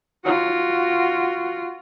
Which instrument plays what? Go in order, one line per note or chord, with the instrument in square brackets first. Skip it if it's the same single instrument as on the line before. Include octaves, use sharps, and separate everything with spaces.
[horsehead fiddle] F4 F#4